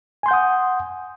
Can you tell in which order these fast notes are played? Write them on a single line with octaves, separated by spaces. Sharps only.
G#5 C6 G6 F#5 D#6